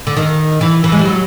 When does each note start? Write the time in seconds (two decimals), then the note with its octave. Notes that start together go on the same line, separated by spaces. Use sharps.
0.07 D3
0.17 D#3
0.61 E3
0.84 E3
0.92 G#3
0.99 G3
1.05 F#3